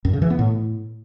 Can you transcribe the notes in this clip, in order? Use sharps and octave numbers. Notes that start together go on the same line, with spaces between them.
F#2
C#3
E3
B3
A2